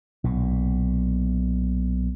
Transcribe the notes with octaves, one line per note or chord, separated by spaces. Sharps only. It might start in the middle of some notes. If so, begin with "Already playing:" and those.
B1 A#2